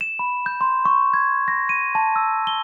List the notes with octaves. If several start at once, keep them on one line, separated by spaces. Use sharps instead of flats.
E7
B5
G6
C6
C#6
G#6
A#6
D#7
A5
E6
G7